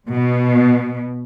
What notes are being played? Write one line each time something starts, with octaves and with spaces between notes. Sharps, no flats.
B2